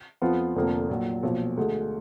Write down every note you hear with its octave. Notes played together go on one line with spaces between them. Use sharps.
F2 F3 B3 F4
F1 F2 D3 F3 A#3
A#1 A#2 F#3
B1 A#2 F3
D2 D3 G#3